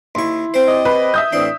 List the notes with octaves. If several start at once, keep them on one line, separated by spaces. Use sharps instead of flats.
D#2 E4 C6 C#6
C4 C5
G4 D5 D#5
B4
E5 D#6 G6
A2 E3 C4 D4 C6